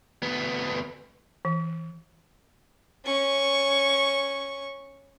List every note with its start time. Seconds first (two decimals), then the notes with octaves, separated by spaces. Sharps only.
0.23 D2 B3
1.45 E3
3.05 C#4 C#6